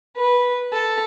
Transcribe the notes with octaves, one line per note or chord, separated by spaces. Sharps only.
B4
A4